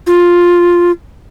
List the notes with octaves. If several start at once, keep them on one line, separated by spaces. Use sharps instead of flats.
F4